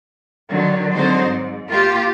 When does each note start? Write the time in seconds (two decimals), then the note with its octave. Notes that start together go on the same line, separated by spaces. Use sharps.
0.50 D3 D#3 F#3
0.93 D3 F#3 G#3 C4 D#4 C5
1.23 G#2
1.68 A#3 F4 G4